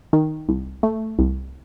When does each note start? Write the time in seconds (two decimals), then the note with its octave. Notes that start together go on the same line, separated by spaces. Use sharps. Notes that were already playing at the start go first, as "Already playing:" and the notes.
0.13 D#3
0.49 C2
0.83 A3
1.19 C2